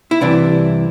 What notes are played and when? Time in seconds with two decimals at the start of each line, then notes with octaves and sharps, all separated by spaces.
0.11 E4
0.21 C2 C3 E3 D4